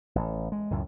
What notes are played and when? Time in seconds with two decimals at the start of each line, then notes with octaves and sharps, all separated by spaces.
0.15 A1
0.52 G#3
0.71 C#2 F#2 A2